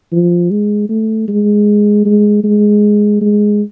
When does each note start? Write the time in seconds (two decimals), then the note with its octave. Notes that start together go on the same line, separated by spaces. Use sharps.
0.12 F3
0.51 G#3
0.89 A3
1.28 G#3
2.05 G#3
2.44 G#3
3.22 G#3